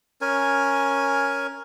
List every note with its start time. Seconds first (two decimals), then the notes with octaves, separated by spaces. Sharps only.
0.21 C#4 A#4 G#5